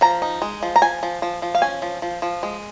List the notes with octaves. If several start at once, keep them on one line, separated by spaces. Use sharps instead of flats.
F3 A#5
D#4
G#3
F3
A#5
F3 G#5
F3
F3
F3
F5
C#4 G#5
F3
F3
F3
G#3